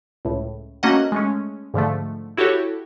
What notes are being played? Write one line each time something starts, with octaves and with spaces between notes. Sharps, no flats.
C#2 A2
A3 A#3 C#4 F#4 D#5 F#5
G#3 A3 C#4
G#2 D3 F3 A3
E4 F#4 G4 A4 C#5